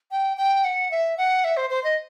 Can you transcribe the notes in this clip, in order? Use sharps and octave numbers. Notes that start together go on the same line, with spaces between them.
G5
G5
F#5
E5
F#5
E5
C5
C5
D#5